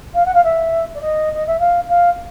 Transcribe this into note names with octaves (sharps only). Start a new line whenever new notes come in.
F5
F#5
F5
E5
D5
D#5
D#5
E5
F5
F5